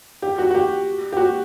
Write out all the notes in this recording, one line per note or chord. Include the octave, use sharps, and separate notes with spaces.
G4
F#4
F#4
G4
G4
F#4